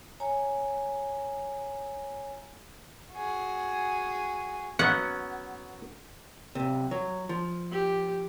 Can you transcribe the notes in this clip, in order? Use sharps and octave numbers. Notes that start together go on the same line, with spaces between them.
C#5 G#5 A#5
F#4 G#4
F#3 B3 C#4 F#5
B1 C3
F#3
F3
G4